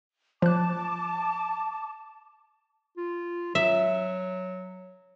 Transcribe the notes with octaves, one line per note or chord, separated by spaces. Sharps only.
F3 A5 D6 F#6
F4
F#3 E5